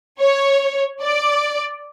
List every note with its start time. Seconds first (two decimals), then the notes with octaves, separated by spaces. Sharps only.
0.20 C#5
1.01 D5